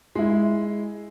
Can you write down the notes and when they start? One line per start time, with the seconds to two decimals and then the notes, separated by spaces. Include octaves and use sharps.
0.15 G#3 E4